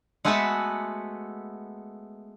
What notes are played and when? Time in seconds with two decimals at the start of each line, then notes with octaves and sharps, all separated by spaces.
0.25 G#3 A3 B3 F#4 B4 E5